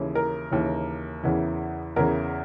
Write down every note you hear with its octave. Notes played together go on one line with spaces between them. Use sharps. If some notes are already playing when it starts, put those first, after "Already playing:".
Already playing: D#2 C#3 E3
A#4
D#2 C#3 E3
E2 C#3 E3
E2 C#3 E3 A#4